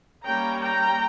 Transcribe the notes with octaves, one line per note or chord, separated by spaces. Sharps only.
G3 A#3 C#4 G5 A#5
G5 A#5